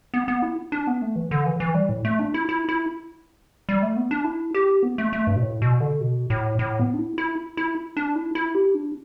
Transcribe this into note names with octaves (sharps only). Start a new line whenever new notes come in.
B3
B3
E4
D4
B3
A3
E3
D3
E3
E3
G3
A2
A3
D4
E4
E4
E4
G3
A3
B3
D4
E4
G4
B3
A3
A3
G2
B2
A2
B2
D3
B2
A2
A2
B3
D4
E4
E4
E4
D4
E4
E4
G4
D4